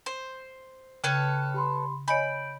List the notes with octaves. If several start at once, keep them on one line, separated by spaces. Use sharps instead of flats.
C5
C#3 A4 B4 C#5 G5 F6
G4 B5 C6
C#5 D#5 G#5 B5 G6 D7